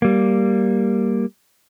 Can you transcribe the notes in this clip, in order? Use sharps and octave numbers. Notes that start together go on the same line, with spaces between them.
G3 A#3